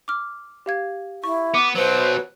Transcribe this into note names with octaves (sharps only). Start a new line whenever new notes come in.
D6 F6
G4 F5 G#6
E4 C#6
B3 D6
B2 F#3 B4 C5